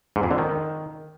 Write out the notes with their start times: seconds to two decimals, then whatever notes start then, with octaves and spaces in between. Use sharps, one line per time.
0.16 G#2
0.23 F2
0.31 D3
0.38 D#3